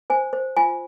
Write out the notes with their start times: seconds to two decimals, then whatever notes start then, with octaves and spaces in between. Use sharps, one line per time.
0.10 C5 G#5
0.33 C5
0.57 F4 G#5